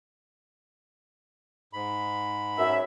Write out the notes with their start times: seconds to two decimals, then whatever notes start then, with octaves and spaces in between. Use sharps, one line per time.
1.73 G#2 B5
2.58 F#2 E5